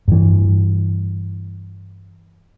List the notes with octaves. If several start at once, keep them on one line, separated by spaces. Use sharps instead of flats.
G2 E3